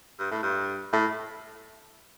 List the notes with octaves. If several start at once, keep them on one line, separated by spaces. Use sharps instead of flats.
G2
A2
G2
A2